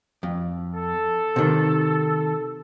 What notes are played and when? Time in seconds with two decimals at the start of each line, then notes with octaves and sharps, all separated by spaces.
0.23 F2
0.75 A4
1.36 C3 D#3